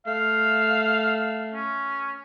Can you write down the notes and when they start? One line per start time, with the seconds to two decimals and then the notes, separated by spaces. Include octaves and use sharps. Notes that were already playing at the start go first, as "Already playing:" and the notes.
0.07 A3 F5
1.54 C#4